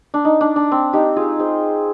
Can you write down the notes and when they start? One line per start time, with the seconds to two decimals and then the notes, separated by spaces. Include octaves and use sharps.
0.14 D4
0.25 D#4
0.41 D4
0.56 D4
0.72 C4
0.93 D#4 G4
1.16 F4 G#4
1.39 G#4 C5